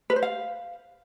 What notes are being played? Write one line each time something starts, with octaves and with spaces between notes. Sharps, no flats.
B4
C5
F5